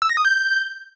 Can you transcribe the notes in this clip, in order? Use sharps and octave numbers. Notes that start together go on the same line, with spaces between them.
E6
A#6
D#6
G6